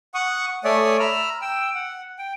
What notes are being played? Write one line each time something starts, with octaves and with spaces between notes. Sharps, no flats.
F#5 C#6 D#6
A3 C#5 D5 E5 G#5 D#6
A#5 B5 E6 F6
G5 E6
F#5
G5